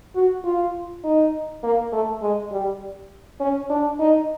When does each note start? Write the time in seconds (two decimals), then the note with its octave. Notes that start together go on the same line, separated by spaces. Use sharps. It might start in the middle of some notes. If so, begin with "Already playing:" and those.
0.15 F#4
0.45 F4
1.04 D#4
1.64 A#3
1.92 A3
2.22 G#3
2.52 G3
3.40 C#4
3.70 D4
4.00 D#4